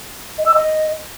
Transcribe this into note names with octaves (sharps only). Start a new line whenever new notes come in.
D#5
E6
D#5